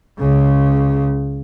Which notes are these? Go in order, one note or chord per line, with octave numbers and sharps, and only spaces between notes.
C#2 C#3